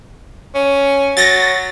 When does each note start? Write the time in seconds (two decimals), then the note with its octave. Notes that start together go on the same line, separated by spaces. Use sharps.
0.55 C#4
1.17 F#3 A6 A#6